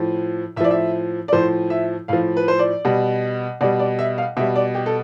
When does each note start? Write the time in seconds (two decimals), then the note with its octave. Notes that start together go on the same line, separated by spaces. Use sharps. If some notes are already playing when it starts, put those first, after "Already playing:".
Already playing: A2 F3
0.56 A2 E5
0.60 F3 D5
0.71 E5
1.28 D5
1.32 A2 F3 C5
1.70 E5
2.08 A2 F3 F5
2.37 B4
2.48 C5
2.59 D5
2.85 B2 G3
3.61 B2 G3 D5
3.79 D5
3.99 E5
4.18 F5
4.37 B2 E5
4.40 G3
4.56 D5
4.75 G4
4.86 A4